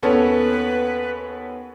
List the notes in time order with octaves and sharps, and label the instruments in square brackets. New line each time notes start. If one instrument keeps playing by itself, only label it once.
[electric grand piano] D#2 B3 C#4 [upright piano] A4 C#5 [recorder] B4